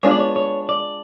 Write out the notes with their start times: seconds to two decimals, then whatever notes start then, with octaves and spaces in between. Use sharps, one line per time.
0.03 G#3 B3 D4 F4 C#5
0.11 D5
0.19 C#5
0.36 C#5
0.69 D5